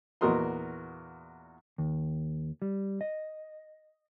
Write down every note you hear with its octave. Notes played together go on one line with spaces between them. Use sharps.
E2 A#2 F#4 A#4 D#5 C6
D#2
G3
D#5